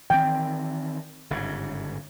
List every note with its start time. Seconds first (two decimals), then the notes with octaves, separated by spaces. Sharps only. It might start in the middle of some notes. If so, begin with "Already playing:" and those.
0.10 D#3 E3 C4 G5
1.30 G1 G#2 C#3